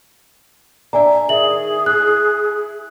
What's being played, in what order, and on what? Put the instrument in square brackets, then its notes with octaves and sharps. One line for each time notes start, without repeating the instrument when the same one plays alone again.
[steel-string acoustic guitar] D4 E5 [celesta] D5 G#5 A#5
[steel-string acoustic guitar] D#3 [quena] G#4 [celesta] E5 F#7
[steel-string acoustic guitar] E4 [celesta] F#6